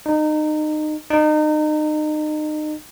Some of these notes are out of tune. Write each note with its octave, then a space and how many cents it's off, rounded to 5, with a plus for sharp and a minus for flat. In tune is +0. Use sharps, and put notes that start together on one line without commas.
D#4 -25
D#4 -30